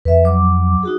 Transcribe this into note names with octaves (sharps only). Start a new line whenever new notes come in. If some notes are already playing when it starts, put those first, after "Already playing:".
F2 B4 E5
F#3 D6
D#4 F#4 G#4